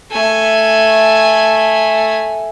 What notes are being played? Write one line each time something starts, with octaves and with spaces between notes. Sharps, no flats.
A3 G#5